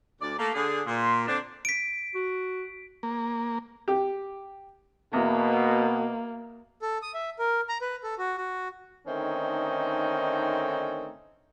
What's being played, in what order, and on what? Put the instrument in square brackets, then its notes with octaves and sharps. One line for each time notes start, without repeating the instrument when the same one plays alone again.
[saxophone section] D2 D5
A3 A#3
D3 G#4
[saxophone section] A#2 [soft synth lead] C6
[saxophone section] D3 C4 D4
[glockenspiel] B6 D7
[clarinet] F#4
[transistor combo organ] A#3
[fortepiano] G4
[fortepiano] E2 [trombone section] B2 [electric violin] A#3
[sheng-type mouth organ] A4
D#6
E5
A#4
A#5
B4
A4
F#4
F#4
[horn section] D3 D#3 A3 C4 C#4 D#4